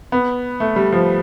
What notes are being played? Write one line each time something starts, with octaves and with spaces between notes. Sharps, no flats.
B3
A3
G3
F3